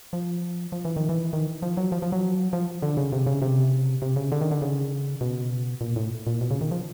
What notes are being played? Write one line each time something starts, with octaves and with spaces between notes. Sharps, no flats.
F3
F3
E3
D#3
E3
D#3
F3
F#3
F3
F3
F#3
F3
D3
C#3
C3
C#3
C3
C3
C#3
D3
D#3
D3
C#3
B2
A#2
A2
A#2
B2
C#3
D#3
F3